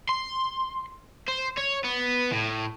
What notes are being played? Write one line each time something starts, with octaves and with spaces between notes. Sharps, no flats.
C6
C5
C#5
B3
A2